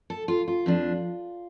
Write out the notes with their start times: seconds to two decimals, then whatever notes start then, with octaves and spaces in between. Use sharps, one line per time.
0.10 A4
0.28 F4
0.48 F4
0.66 F2 F3 D4